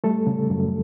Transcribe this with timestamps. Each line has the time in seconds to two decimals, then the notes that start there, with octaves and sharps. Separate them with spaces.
0.04 G3 A3 A4
0.27 C#3
0.50 F#2